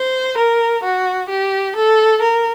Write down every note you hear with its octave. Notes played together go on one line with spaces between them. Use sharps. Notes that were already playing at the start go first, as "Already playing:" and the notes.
Already playing: C5
A#4
F#4
G4
A4
A#4